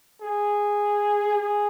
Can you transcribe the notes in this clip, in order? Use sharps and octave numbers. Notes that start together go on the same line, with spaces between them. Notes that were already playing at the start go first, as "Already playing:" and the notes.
G#4
G#4